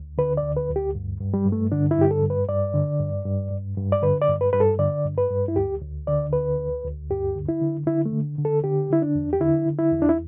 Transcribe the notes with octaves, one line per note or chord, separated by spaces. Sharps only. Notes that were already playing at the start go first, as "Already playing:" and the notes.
Already playing: D2
D3 B4
D5
D2
B4
D2
G4
G2
G2
G3
G2
A3
D3 D4
E4
G2 G4
A4
G2
B4
G2 D5
D3
G2
G2
G2
G2
D5
D3 B4
D5
G2
B4
G2 B4
A4
D3 D5
G2
B4
G2
E4
D2 G4
D2
D3 D5
D2 B4
D2
D2
G2 G4
D3
E4
D3
D3 E4
A3
D3
D3
A4
D3 G4
D3 E4
D4
E2
G4
D3 E4
D3
E4
E2
D4
E4